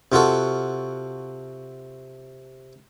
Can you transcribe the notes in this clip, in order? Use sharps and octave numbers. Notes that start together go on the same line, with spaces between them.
C3 F4 F#4 A4